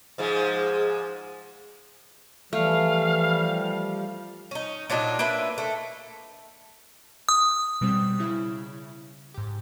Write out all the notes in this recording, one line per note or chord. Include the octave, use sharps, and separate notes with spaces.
G#2 F3 G#3
E3 F3 G3 A3 F5
C#4 D#4
A#2 F#3 D4 D#4
A#3 D4 B4 E5
A3
D#6
B2 G3 C4
C#3 E4
G#2 G4